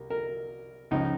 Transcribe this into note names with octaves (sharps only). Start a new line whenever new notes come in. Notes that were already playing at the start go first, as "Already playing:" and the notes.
Already playing: C2 A#4
A#4
C#2 C#3 F3 D#4